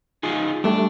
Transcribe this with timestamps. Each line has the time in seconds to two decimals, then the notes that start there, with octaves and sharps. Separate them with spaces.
0.23 D#4 F4 G#4
0.64 G3 A3 D4